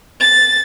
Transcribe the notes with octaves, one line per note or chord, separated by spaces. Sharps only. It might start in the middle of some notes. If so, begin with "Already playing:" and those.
A6